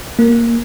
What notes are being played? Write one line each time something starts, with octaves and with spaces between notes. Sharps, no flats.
A#3